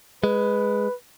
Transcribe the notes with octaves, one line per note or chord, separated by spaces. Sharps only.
G#3 B4